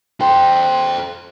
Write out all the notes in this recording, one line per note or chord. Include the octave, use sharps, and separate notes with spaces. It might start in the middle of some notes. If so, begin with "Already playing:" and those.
A4 C5 G5 C6